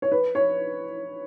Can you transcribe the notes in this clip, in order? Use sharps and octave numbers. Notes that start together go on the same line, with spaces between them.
C#5
B4
C#5